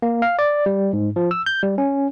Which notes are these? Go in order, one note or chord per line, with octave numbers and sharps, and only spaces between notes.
A#3
F5
D5
G3
G#2
F3
E6
G6
G3
C#4